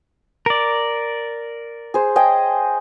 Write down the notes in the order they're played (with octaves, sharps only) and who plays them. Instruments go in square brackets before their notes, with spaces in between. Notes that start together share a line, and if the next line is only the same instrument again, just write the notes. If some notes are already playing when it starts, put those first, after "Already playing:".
[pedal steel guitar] A#4 D5
[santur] G#4 C5
G#4 D#5 G5